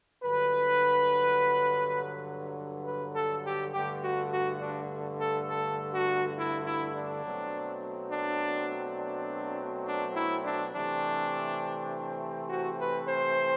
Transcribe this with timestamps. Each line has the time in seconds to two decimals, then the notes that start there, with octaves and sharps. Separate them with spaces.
0.23 G2 D3 F#3 B4
2.85 B4
3.14 A4
3.44 G4
3.73 G2 D3 A3 G4
4.02 F#4
4.31 F#4
4.60 D4
5.20 A4
5.49 A4
5.92 F#4
6.36 E4
6.66 E4
6.95 D4
7.24 B2 F#3 A3 C4
8.11 D4
8.98 D4
9.87 D4
10.15 E4
10.44 D4
10.73 C3 E3 A3 C4 D4
12.49 F#4
12.79 B4
13.07 C5